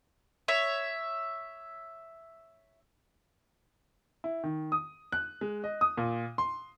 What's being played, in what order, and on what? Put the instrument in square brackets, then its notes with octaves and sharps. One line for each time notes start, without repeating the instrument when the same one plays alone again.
[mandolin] C#5 E5
[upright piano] E4
D#3
D#6
F#6
G#3
D#5
D#6
A#2
C6